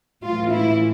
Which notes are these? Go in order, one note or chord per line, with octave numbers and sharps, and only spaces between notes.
A2 E3 F4
E4